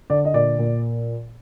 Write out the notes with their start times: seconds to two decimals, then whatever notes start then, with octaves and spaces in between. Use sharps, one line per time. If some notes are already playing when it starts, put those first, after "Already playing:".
0.10 D3 D5
0.25 D#5
0.34 A#2 D5
0.59 A#2